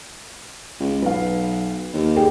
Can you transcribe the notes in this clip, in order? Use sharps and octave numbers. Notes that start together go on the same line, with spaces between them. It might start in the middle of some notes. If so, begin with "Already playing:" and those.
C#2
B1 B4 F5
D#2
G4 G#4 G5